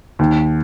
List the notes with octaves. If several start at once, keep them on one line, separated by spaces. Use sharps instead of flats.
D#2